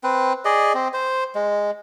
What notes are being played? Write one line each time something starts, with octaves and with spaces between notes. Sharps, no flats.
C4 B4
G#4 D5 D#5
C4
C5
G#3